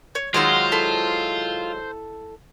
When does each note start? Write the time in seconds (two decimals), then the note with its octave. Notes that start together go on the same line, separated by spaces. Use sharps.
0.15 C#5
0.34 D#3 F#3 G#3 F4 C5 F5 F#5 E6
0.72 E4 A4